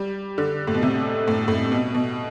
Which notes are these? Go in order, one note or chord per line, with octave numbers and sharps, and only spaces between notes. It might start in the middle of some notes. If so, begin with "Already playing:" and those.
Already playing: G3
D3
A2
B2
C3
A2
A2
B2
B2